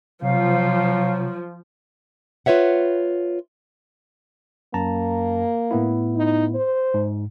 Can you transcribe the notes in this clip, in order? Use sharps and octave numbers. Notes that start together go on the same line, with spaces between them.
C3 F3 F#3 F5
F4 B4 C#5 E5 F#5
F#2 A#3 A5 A#5
A2 B3 E4
D#4
C5
G#2